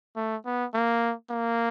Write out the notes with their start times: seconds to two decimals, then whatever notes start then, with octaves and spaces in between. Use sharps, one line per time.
0.16 A3
0.45 B3
0.74 A#3
1.30 A#3